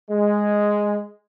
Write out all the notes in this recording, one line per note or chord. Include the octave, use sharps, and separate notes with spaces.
G#3